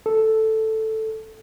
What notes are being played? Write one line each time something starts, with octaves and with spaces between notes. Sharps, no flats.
A4